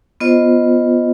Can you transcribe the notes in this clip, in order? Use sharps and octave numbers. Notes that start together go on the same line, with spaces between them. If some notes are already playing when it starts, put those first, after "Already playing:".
B3 F4 C5 D#5